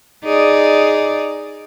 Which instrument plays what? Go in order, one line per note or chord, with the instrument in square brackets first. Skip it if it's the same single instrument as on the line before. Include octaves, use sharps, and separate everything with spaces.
[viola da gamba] D#4 G#4 D5